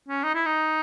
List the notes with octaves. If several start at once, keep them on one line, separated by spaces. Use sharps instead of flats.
C#4
D#4
E4
D#4